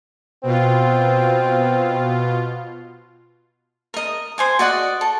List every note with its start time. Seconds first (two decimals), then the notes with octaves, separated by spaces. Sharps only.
0.43 B2 C4 F4
3.94 A#4 D#5
4.38 C5 G#5 D6
4.59 F#4 D5 D#5 F#5
5.01 A4